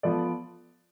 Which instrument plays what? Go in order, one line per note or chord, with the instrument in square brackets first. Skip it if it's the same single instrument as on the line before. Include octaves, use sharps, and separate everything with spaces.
[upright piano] F3 B3 F4 A4 D5